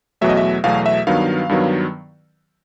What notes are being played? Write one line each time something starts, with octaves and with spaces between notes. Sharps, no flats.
E2 B2 F#3 A3 E5
D#5
E5
E2 B2 F#3 A3 F5
E5
G2 D#3 F#3 B3 F5
G2 D#3 F#3 B3